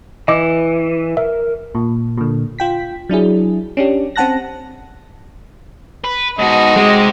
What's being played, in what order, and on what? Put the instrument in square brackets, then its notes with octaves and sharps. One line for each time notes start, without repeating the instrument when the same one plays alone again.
[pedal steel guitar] E3 [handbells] D#5 D6
[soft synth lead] A#4 [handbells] E5
[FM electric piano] A#2
A#2 D3
F4 G5 B6
F#3 D4 E4 G#4
C#4 D4 G4
C4 C#4 F#5 A5 F#6 A#6
[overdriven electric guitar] B4
[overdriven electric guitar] G#2 B2 [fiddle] D#4 F#4 [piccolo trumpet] D#5
[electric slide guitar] G#3 [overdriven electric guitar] C4 G4